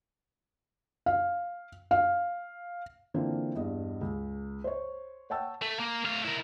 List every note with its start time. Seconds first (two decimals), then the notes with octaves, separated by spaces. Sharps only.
1.06 F5
1.91 F5
3.14 D3 E3 A#3 C4 F4
3.55 E2 G2 D#5
4.01 C#2
4.64 C5 C#5
5.30 C#5 F#5 G5 A5 E6
5.62 A3
5.80 A#3
6.05 A3 F5
6.24 E4 A#4